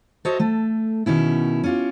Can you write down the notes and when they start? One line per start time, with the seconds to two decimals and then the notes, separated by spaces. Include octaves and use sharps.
0.25 F#4 A4 C5 C#5 D#5 E5
0.40 A3 A4
1.06 B2 D#3 C#4 E4
1.64 C#4 F4 G4